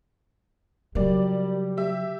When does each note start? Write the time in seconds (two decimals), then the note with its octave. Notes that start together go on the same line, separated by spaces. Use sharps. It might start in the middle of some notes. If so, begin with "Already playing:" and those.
0.95 C#3 F#3 G3 A#3 D5
1.77 G4 E5